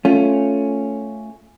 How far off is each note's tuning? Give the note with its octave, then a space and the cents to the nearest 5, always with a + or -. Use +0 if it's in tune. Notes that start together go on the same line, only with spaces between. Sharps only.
A3 +0 C#4 +0 F4 +0